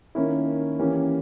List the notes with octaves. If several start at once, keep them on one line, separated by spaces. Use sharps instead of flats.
D#3 A#3 C#4 E4
E3 A#3 C#4 G4